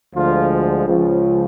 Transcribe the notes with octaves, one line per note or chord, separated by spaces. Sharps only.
D2 D3 F3 G#3 F4
C#2 C#3 F3